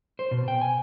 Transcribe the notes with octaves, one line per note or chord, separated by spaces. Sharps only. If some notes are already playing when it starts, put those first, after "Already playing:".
C5
B2
G5
G#5